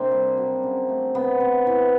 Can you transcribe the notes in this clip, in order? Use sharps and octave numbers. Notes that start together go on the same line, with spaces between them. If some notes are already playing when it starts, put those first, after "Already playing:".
Already playing: C3 A#3 C4 D4
G3
F#3
C#3
A3
C3 B3
C3
E3